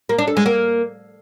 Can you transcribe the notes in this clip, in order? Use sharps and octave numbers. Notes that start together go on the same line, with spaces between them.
A#3
D4
A4
G#3
A#3